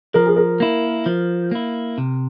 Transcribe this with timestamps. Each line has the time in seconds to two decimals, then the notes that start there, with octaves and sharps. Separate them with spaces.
0.14 F3 A#4
0.26 G#4
0.36 A#4
0.60 A#3 E4
1.06 F3
1.51 A#3 E4
1.98 C3